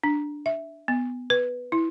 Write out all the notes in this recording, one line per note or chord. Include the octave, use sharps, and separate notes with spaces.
D4
E5
B3
B4
E4